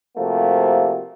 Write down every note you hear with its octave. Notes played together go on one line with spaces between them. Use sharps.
C3 F3 A3 A#3 F#4 G4